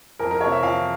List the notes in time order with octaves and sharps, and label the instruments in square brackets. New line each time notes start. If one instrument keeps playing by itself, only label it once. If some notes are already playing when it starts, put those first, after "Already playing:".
[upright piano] F2 A#4
A#4
C3 F3 C#5
E5
F2 F5